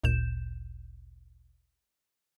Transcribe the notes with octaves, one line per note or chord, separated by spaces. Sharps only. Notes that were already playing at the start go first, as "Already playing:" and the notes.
G#1 D2 A#2 G6 E7